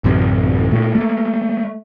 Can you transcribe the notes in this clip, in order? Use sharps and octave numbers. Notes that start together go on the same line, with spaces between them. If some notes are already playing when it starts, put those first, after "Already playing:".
A1 F#2 C3
A#2 A3
A3 A#3